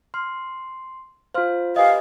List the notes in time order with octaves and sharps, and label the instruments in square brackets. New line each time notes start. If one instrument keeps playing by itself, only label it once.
[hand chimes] C6 [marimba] F6
[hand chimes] F4 C5 [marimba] F5 C6 F6
[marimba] G4 G#5 D#6 [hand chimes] B4 D#5 [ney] F5